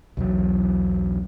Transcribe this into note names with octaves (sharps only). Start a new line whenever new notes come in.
B1 E2 F#3